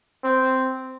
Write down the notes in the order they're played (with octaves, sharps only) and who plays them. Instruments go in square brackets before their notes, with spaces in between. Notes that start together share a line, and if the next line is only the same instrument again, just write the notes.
[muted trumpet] C4